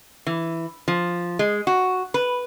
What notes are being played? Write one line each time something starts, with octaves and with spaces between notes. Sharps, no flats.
E3
F3
G#3
F#4
B4